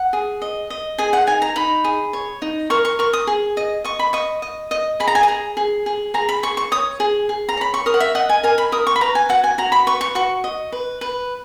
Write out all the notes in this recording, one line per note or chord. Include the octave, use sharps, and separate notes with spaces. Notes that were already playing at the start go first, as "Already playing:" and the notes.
Already playing: F#5
G#4
D#5
D#5
G#4 G#5
F#5
D#4 G#5
A#5
D#4 B5
G#4
C#5
D#4
A#4 C#6
C#6
A#4 C#6
D#6
G#4
D#5
D#5 C#6
B5
D#5 C#6
D#5
D#5
G#4 B5
A#5
G#5
A#5
G#4
G#4
G#4
G#4 A#5
B5
G#4 C#6
C#6
C#5 D#6
G#4
G#4
A#5
C#5 B5
C#6
A#4 D#6
F#5
E5
D#5 F#5
G#5
A#4 G#5
B5
A#4 D#6
C#6
B5
B4 A#5
G#5
F#4 F#5
G#5
F#4 A#5
B5
B4 C#6
C#6
F#4 C#6
D#5
B4
B4